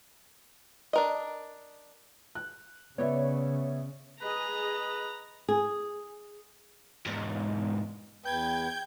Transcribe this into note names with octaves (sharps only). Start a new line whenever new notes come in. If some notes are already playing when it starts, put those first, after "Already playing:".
D4 A#4 D#5
F#6
C#3 B3 C#5 D5 E5
G#4 B4 D#5 A#5
G#4
E2 G#2
E2 B4 G5 G6 G#6